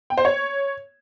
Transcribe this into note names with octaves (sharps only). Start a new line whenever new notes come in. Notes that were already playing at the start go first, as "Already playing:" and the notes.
G5
C5
C#5